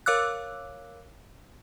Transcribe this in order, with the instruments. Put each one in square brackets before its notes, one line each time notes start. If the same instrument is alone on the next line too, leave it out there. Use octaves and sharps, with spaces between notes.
[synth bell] A#4 C#5 F5 D6 E6 F#6